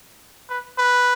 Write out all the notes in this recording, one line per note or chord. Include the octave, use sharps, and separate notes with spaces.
B4
B4